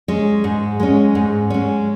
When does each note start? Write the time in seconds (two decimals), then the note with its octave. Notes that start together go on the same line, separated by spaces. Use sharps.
0.08 G#3 C#4
0.44 G#2
0.80 G#3 C#4
1.15 G#2
1.50 G#3 C#4